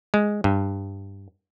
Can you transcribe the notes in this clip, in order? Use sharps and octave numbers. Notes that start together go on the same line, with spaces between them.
G#3
G2